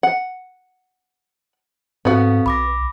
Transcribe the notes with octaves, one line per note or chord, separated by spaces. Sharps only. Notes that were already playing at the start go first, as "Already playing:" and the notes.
F#5
G#2 B3 C4 F#4 A4 F5
B1 B5 D6 A#6